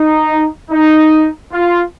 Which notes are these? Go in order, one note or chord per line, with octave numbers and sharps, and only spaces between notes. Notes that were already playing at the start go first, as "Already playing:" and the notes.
Already playing: D#4
D#4
F4